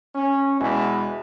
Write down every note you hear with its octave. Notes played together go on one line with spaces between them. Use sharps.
C#4
E2 B2 E3 G#3